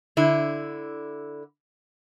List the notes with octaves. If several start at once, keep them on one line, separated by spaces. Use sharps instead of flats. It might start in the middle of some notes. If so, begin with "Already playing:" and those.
D3 E4